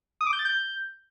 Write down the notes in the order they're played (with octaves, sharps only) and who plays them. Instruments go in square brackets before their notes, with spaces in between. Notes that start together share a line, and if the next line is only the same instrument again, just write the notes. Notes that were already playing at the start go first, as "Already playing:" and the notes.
[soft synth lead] D#6
D6
G6
A6
G6